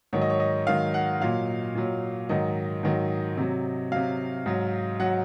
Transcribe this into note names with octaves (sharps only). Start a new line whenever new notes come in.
G#2 D#3 F#3 C#5
D#5
C#5
D#5
G#2 D#3 F#3 F5
F#5
A#2 F#3 F5
A#2 F#3
G#2 D#3 F#3 D#5
G#2 D#3 F#3
C3 F#3
C3 F#3 F5
G#2 F#3
F#3 F#5